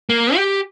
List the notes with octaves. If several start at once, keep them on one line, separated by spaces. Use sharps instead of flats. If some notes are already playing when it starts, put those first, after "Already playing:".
A#3
G4